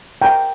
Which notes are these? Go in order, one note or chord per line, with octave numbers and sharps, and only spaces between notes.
A#4 G5 A#5